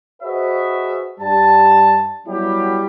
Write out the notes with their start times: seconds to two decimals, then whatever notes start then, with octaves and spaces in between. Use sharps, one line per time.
0.23 F#4 G#4 B4 C5 D#5 E5
1.20 G2 G3 A5
2.27 F#3 G3 B3 E4 G4